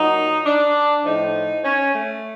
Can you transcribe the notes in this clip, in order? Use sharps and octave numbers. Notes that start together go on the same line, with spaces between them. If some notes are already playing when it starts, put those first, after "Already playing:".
Already playing: A#2 F#3 D#4
D4
A2 F3 D#4
C#4
A3